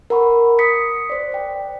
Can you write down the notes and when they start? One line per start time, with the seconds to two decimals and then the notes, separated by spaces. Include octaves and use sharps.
0.10 A#4 F#5 B5 C#6
0.59 D#6 B6 C#7
1.10 C5 D5
1.32 D5 G5